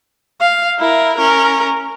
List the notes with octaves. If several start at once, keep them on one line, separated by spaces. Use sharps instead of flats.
F5
E4 A#4
C#4 A#4